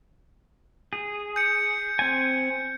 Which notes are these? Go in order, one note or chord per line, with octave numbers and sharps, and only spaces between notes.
G#4
G6 C#7
C4 G#5